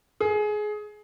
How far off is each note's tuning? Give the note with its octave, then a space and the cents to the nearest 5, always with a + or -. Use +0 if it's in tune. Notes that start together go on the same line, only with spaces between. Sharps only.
G#4 +20